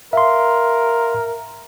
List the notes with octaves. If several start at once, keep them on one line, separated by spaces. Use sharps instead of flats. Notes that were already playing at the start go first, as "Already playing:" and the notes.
A#4 E5 F5 C6